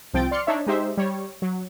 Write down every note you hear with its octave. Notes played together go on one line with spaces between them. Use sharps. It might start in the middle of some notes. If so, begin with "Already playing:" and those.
C2 F3 C4 G5 A6 D7
D5 C6 F6 C#7
D4 D#4 C#5 E5
G#3 D#4 G4 C5 E5
G3 C#5
F#3